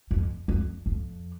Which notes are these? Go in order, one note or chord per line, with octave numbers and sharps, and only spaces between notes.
F2
F2
F2